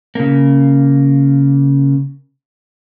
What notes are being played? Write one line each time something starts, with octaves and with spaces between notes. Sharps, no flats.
C#3 A#3